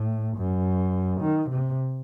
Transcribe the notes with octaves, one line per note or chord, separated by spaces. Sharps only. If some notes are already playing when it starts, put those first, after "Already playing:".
Already playing: A2
F#2
D#3
C3